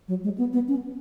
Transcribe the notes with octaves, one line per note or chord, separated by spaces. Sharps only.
F#3
G#3
B3
B3
C#4